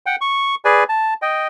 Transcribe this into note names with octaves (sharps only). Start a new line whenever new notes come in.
F#5 G5
C#6
G#4 B4 D5 G#5
A5
D#5 G5